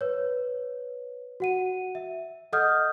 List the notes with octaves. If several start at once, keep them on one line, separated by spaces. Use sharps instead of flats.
B4 C#5
F#4 F#5 D#7
E5
A4 D#5 F#5 D#6 F6 G6